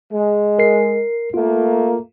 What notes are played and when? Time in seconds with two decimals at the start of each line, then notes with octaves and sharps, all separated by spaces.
0.12 G#3
0.59 A#4 C7
1.34 A3 A#3 F4